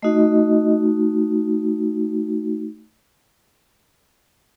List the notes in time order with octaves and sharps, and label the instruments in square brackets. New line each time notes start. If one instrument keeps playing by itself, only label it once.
[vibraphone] A3 D#4 F#4 D#5